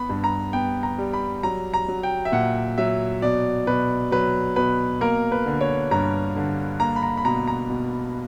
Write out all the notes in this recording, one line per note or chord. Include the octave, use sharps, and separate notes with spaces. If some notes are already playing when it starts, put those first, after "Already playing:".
Already playing: B3 B5
G2
A#5
B3 G5
A#5
G3
B5
F#3 A#5
A#5
F#3
G5
E5
A#2 F#5
F#3 E5
B2 D5
B2 B4
F#3 B4
B2 B4
A#3 A#4
B4
D3
C#5
G2 A#5
D3
A#3 A#5
B5
A#5
B5
B2 A#5
A#5
B2